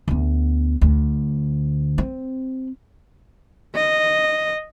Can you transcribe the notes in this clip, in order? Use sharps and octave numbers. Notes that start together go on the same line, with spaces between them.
D2 B3
D2
C4
D#5